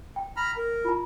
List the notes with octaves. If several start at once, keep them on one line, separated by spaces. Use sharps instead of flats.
G5
A#5 B5 F6
A#4
F4 A#5